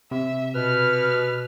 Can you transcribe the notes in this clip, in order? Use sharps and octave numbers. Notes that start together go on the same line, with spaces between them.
C3 E5
B2 B4 F6